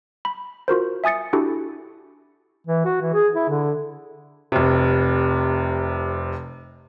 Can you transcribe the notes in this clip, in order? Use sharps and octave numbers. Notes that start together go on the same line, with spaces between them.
B5
F4 F#4 A#4 C5
E5 G#5 D#6 A6 C#7
D4 E4 F#4 G4 A4
E3
F#4
E3
G#4
E4
D3
F1 C3